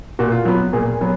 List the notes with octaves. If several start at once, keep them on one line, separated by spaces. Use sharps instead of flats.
A#2 F#4
F4
F#3 B3
A#2 G#4
F#3 B3